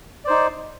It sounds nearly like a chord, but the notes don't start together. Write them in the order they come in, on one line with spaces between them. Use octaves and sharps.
D5 C5 D#4